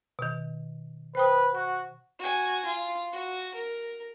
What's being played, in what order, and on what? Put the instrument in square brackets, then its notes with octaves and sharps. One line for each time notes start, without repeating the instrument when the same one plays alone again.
[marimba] B2 D#3
[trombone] B4 [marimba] C5 G5 D#6
[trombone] F#4 [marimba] F#6
[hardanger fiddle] F#4 G#5
F4
F#4
A#4